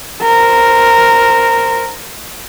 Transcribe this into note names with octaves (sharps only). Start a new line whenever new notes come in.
A#4 C5